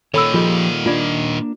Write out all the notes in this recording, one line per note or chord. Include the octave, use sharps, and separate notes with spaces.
A#2 D#3 A4 C#5 B5 E6
F3 F4 G4 G#4 D#5
A#3 D4 F4 D5